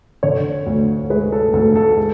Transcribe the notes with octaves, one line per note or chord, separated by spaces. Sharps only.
D3 C#5
D2
G#3 B4
A4
D2 A4
A4
G#3